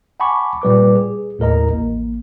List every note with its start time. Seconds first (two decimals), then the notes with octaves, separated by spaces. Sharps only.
0.20 F#5 G#5 A5 B5 C#6 D6
0.62 A#2 G3 B4 D6
0.96 G#4
1.39 D#2 A2 A#4 D#5 A#5
1.69 A1 A#3